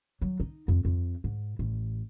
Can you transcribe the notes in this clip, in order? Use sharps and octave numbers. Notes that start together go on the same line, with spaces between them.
F#3
D#4
F2
F2
G#2
A1